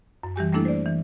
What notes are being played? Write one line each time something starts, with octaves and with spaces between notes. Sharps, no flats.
F#2
E3 G3 G4 G#5
G3 A3 A#3 D4 E4 A4
C5 D5
E3